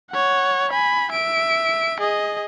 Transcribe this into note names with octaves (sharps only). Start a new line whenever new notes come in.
C#5 F#5
G#5 B5
E5 D7
G#4 D#5